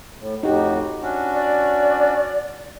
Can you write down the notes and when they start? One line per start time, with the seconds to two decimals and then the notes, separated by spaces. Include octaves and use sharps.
0.18 A2
0.43 F2 A2 D#4 F#4 G4
1.02 C#4 D4 F#4
1.34 D5